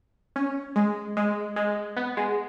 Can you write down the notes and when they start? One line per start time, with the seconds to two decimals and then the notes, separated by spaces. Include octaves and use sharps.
0.36 C#4
0.76 G#3
1.17 G#3
1.56 G#3
1.97 B3
2.17 G#3